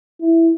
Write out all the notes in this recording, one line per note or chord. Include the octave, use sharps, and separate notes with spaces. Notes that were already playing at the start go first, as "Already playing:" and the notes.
E4